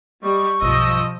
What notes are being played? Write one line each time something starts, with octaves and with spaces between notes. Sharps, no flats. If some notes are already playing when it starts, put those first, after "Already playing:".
G3 D#5 C#6
B1 G2 F3 D#5 E6